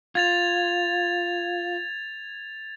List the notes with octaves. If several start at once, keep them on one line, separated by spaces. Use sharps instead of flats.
F4 G#6 A6 F7